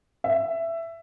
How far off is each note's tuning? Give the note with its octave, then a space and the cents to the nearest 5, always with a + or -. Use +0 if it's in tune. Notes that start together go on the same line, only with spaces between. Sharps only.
E5 +15